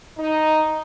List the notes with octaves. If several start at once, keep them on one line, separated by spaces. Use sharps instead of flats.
D#4